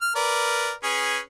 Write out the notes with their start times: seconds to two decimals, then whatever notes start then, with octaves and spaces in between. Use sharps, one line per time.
0.02 F6
0.15 A#4 B4 D5
0.83 C#4 G#4 B4